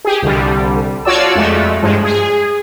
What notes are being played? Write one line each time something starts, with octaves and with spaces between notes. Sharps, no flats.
G4 G#4
C2 D3 G3
F4 F#4 C#5 D5 A5 E6
F2 G#3 A3
G2 F3 G#3
G#4